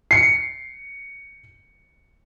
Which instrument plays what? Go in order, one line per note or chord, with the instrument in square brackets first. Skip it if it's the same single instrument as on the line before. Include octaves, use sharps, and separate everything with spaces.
[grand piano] C7 C#7